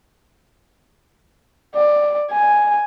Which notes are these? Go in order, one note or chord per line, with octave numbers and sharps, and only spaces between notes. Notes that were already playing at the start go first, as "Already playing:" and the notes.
D5
G#5